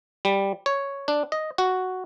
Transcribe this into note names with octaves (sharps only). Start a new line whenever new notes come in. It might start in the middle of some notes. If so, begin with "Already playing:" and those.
G3
C#5
D4
D#5
F#4